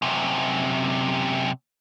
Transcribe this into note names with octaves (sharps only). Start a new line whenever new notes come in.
F#2 C3